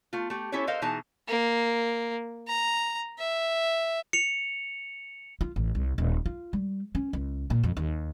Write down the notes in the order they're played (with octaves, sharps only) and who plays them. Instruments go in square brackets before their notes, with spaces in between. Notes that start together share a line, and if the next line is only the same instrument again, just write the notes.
[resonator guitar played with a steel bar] A3 F4
A3 G4
C#4 E4 G4 A4 C#5
A4 A#4 C5 D#5 F5
B2 E3 D#4 G#4 A5 A#5
[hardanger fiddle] A#3
A#5
E5
[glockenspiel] C#7 F7
[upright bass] F4
A1
C2
D#1
F4
G3
C#4
C#2
A#2
F2
D#2